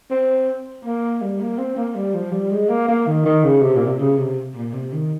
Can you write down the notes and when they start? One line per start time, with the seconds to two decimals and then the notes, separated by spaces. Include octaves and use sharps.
0.11 C4
0.85 A#3
1.22 G3
1.40 A#3
1.59 C4
1.76 A#3
1.95 G3
2.14 F3
2.32 G3
2.51 G#3
2.69 A#3
2.88 A#3
3.07 D#3
3.26 D#3
3.44 C#3
3.62 C3
3.76 A#2
3.87 C3
3.99 C#3
4.18 C3
4.56 A#2
4.73 C3
4.92 D#3